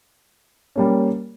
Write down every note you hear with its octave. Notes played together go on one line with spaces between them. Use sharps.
G3 A#3 C#4